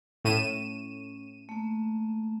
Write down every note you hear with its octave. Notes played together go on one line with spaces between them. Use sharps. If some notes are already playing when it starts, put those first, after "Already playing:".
A2 C#4 D#7 E7
A3 A#3